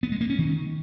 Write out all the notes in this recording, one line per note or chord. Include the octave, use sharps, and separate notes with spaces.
B3
G#3
A#3
C#4
D#3